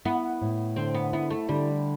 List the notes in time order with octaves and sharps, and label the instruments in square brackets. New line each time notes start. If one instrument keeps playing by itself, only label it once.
[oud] B3 [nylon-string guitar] E4
[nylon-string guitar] A2
[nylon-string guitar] D3 [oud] C4
[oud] B3
[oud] B3 [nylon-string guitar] E4
[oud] A3
[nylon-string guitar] D3 [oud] G3